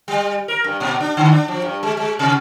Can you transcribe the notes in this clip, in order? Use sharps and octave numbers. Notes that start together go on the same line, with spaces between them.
G3
A#4
G2
A#2
D4
D3
D4
F3
G2
G#3
G#3
C3